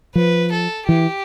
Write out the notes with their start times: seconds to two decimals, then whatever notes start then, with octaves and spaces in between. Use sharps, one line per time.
0.15 F3 B4
0.52 A4
0.87 E3 G4